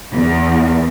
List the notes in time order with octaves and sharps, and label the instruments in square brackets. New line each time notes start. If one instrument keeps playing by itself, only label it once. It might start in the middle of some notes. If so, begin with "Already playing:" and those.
[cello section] E2